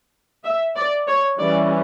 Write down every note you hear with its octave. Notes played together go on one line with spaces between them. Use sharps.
E5
D5
C#5
E3 G3 C#4 D5